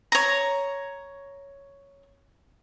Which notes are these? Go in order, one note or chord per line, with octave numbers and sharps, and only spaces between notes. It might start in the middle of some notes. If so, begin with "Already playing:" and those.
C#5 A#5